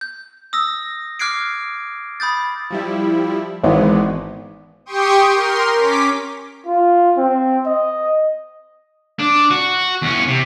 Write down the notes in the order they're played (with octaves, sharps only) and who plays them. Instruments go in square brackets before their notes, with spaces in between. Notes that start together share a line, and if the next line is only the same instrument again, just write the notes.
[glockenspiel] G6
D#6 E6 A#6
D6 F6 F#6 G#6 C7 D7
B5 D#6 G6 A6
[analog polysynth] F3 G3 E4
[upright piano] G#1 [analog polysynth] E3 G#3 B3
[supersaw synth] G4 G5 C6 C#6 D#6
A#4 C6
C#4 D6 B6
[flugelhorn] F4
C4
D#5
[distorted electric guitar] D4
F#4
E2 C#4
C3